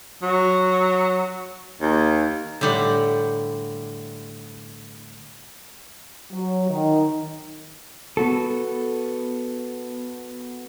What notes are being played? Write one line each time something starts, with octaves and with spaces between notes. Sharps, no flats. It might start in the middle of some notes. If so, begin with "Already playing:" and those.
F#3
D#2
A2 D3 G3 F#5
F#3
D#3
B3 F#4 A4